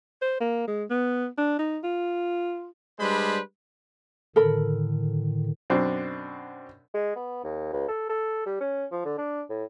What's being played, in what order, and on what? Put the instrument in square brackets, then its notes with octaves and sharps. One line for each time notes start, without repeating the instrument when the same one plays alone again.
[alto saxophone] C5
A#3
G#3
B3
D4
D#4
F4
[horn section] G3 G#3 D4 B4 C5 B5
[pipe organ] A2 D3 D#3 [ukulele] A4 A#4 B5
[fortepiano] F#2 B2 C4 D4
[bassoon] G#3
B3
D#2
C#2
A4
A4
G3
C#4
F3
D3
D4
A2